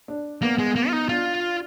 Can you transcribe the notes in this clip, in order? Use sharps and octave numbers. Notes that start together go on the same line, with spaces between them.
D4
A#3 B3
G#3
A#3
F4
D#4
D4 F4